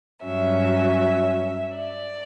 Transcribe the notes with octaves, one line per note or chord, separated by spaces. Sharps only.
G2 F#3 C#4 E5
D5